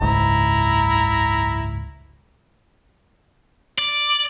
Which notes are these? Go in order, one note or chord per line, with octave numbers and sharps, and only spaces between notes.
F#1 C#2 G#2 E4 A#5
D5